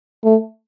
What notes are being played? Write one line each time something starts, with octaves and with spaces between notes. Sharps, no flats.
A3